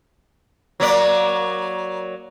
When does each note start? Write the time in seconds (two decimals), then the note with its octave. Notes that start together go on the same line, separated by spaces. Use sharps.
0.80 F#3 A#3 D5